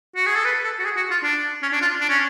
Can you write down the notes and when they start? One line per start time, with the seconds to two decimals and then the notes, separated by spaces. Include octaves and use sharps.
0.16 F#4
0.26 G#4
0.36 A4
0.45 B4
0.64 A4
0.79 F#4
0.85 G#4
0.96 F#4
1.11 F4
1.23 D4
1.62 C#4
1.72 D4
1.81 F4
2.01 D4
2.09 C#4